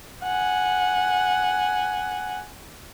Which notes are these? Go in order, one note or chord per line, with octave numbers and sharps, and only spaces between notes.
F#5 G#5